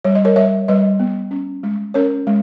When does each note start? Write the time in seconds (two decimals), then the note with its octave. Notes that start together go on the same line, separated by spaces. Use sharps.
0.04 G3 C#5
0.15 D#5
0.25 A#4 C#5
0.36 G3 C#5 E5
0.68 G3 B4 D#5
1.00 B3
1.31 C#4
1.63 G#3
1.94 C#4 A#4 C#5
2.27 G#3